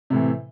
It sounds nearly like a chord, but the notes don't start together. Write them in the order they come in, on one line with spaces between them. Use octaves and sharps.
C3 A2 E3